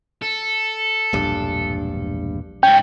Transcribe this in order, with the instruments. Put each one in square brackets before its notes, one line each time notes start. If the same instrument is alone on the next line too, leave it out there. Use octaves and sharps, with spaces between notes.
[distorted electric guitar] A4
[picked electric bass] E1 A#1 G2
[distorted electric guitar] G#2 C#4 [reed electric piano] G5